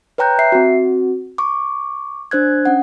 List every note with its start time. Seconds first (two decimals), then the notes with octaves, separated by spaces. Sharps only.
0.18 B4 C#5 G5 A#5 F#6 G6
0.39 E5 C7
0.52 C4 F#4
1.38 C#6 D6
2.31 D4 C5 F#6 G#6
2.65 C#4 F#5